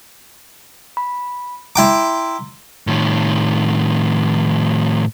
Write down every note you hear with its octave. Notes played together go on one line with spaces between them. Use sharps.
B5
E4 G5 A#5 C6 D6
A2 D#3